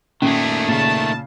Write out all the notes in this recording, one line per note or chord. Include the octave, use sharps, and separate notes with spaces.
A#2 D#3 A3 C#4 E4 G4 G#4
A#2 C#3 A5 C7